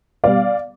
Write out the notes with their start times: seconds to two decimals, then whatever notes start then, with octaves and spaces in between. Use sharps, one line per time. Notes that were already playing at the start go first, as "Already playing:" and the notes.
0.24 B2 G3 D5 F5